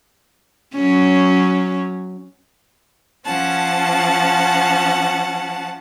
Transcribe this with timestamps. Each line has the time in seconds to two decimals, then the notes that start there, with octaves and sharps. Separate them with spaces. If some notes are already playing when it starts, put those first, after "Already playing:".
0.75 F#3 C#4
3.25 F3 C#4 F#5 A5